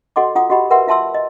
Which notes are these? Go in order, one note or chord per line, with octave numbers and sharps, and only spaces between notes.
F#4 A4 D#5 F#5 C6 D6
F4 F#5 D#6
F#4 G4 D#5 F#5 B5
A#4 B4 E5 F#5 C6
F4 E5 A5 C6 E6
D#5